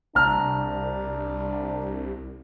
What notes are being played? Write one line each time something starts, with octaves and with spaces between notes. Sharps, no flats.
C2 D4 A5 A#5 F6